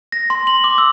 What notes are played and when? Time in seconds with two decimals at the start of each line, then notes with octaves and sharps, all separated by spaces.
0.12 A#6
0.30 C6
0.47 F#7
0.64 D6
0.78 E6